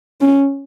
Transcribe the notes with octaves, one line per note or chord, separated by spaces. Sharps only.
C#4